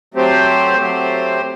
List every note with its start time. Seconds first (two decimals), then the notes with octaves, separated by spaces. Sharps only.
0.14 F#3 A3 C4 G4 C5
0.78 F#3 A3 C4 G4 C5